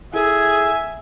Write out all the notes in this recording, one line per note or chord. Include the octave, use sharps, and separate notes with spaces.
E4 G#4 A4 E5 G#5